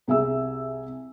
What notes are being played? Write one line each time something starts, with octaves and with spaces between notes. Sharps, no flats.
C2 G#4 E5 E6